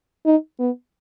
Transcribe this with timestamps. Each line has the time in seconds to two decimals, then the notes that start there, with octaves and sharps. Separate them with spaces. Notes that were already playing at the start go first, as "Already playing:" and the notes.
0.25 D#4
0.59 B3